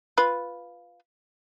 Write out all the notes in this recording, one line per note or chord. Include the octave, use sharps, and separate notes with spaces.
F4 B4